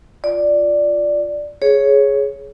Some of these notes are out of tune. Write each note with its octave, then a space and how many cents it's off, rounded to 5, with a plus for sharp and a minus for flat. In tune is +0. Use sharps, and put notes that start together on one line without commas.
F4 +0 D5 +0
G#4 +10 C#5 +0